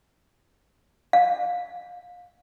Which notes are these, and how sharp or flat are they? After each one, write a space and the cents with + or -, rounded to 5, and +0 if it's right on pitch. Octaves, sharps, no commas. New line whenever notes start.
F5 +25